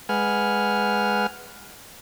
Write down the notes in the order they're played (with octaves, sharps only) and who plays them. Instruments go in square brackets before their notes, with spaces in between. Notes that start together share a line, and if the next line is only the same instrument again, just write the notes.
[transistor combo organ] G#3 B4 F#5 G#5 F6